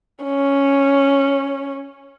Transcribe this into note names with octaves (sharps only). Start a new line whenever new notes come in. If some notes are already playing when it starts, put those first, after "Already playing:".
C#4